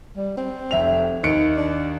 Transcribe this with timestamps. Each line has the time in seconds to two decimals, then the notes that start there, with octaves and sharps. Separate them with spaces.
0.16 G3
0.37 C4
0.71 F1 E5 F7
1.24 D#2 D#4 C#7 D7
1.57 D4